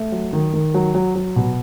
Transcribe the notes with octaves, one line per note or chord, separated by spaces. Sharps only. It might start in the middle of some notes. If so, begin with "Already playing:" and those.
Already playing: A3
F#3
D#3
D#3
F#3
F#3
F#3
B2